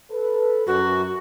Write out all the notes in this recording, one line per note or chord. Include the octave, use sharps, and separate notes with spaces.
A4 B4
F#2 F#4